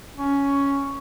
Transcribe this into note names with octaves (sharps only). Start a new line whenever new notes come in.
C#4